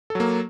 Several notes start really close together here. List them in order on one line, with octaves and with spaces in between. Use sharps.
A4 F#3 A#3